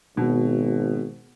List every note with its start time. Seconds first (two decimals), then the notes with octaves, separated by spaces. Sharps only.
0.17 G#1 B2